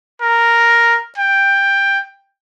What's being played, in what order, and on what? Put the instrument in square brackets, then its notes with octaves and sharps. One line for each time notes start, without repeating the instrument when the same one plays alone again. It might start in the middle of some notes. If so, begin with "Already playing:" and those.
[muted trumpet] A#4
G5